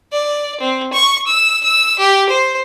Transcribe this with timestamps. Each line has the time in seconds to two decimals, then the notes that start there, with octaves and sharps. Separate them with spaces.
0.12 D5
0.60 C4
0.93 C#6
1.27 E6
1.64 E6
1.99 G4
2.29 C5